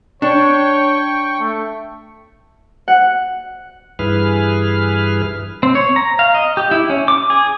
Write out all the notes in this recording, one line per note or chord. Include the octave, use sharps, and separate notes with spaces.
D4 C#5 G5 C#6
A3
F#5
G2 E3 G#4 B4 F6
C4
C#5
A#5
F5
D#5
G4
E4
C#4
D6
G#4